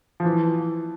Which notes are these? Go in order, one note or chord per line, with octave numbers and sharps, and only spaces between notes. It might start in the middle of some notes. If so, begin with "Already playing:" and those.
F3
E3